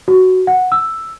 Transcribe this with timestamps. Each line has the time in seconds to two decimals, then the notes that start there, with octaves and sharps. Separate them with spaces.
0.08 F#4
0.47 F#5
0.72 E6